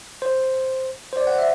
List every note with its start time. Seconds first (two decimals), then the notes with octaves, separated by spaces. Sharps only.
0.22 C5
1.13 C5
1.17 D5
1.27 F#5
1.38 E5